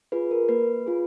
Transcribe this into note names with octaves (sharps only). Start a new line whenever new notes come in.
F4 G#4 B4
A#4
A#3 B4
F4 G#4